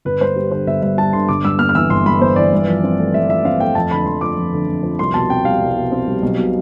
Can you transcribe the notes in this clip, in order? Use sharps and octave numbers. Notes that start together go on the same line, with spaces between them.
G1 B4
G2 C5
G3
D3 C5
G1 E5
G2 E5
G3 A5
D3 C6
G1 D6
G2 E6
B3 F6
F6
E3 E6
G1 C6
G2 B5
B3 C5
E3 D5
G2
F3
C4
A3
G2 E5
F3 E5
C4 F5
A3 G5
F2 A5
D3 B5
F2 C6
F3 D6
F2
D3
F2
F3
C2 C6
B2 A5
C4 G5
G3 F5
C2
B2
C4
G3
B1
B2